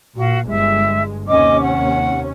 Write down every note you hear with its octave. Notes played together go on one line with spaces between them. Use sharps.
A#2 F#4 F5
G1 G#3 E5
D#2 C3 C#4 D#5 D6
F#5